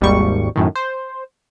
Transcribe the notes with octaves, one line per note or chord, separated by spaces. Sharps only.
G#1 D#2 G3 C#6
F#2 A2 D#3
C5